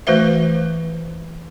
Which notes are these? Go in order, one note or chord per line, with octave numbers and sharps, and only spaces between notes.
E3 A3 F#4 B4 C5 E5